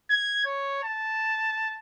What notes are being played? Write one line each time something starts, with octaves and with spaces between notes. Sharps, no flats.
G#6
C#5
A5